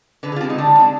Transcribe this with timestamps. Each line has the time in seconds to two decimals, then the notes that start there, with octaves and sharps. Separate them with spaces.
0.23 D3 B4
0.32 G#4
0.36 F4
0.41 C4 G4
0.44 G#3
0.50 D#4
0.58 D3 D4
0.76 G#3 C4